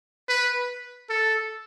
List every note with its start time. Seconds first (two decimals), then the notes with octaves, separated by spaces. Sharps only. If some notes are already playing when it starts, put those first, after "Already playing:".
0.28 B4
1.09 A4